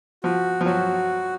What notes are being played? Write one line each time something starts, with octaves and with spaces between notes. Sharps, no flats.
F3 F#4
F3
F#3 F#4